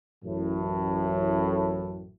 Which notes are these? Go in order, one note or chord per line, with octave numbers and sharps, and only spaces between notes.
A1 F#2 A2